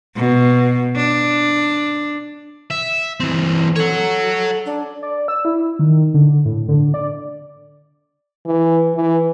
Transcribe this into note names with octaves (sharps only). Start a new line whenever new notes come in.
B2
D4
E5
E3 C4
A4 C#5 F#5
D4
D5
E6
E4
D#3
D3
A2
D3
D5
E3
E3